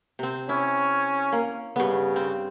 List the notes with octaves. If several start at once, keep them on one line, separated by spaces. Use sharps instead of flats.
C3 C4
C#4 E4
A#3
G2 C#3 B3
C4